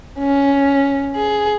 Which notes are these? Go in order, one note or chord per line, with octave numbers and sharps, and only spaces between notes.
C#4
G#4